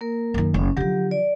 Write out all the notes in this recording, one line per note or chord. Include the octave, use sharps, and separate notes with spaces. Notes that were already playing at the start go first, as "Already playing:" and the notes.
A#3 A#4
F#2 D#3
F#1 C#4
D3 F3 F#3 G4
D5